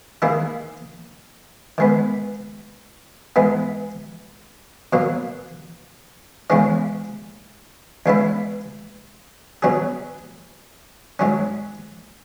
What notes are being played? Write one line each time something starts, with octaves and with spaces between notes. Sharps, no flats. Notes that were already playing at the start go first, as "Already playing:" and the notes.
D#3 A#3 E4 G#4
D#3 G#3 B3
G#2 E3 G#3 B3
B2 F#3 A#3
E2 C#3 E3 G#3 C#4
E2 C#3 G#3 B3 E4
B2 F#3 C#4 G#4
G#2 F#3 C#4